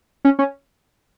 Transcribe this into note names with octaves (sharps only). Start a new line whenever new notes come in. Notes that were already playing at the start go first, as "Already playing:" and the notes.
C#4
C#4